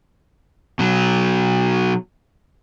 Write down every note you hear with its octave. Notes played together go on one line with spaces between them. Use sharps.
B2 F#3